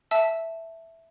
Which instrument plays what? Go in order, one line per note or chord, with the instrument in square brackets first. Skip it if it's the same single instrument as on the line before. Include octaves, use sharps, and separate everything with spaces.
[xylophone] E5 A5 E6